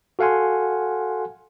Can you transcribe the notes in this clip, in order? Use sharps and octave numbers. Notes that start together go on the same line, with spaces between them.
F#4 A4 F5 F#5 G#5 C6